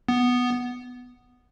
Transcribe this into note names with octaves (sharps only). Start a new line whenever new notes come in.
B3